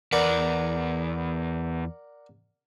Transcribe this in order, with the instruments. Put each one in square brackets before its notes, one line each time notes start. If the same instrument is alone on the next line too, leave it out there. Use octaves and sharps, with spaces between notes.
[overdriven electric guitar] E2 B4 [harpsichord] A#4 D5 F#5